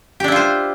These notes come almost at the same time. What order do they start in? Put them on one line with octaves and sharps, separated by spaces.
G4 D4 E4 F4 C5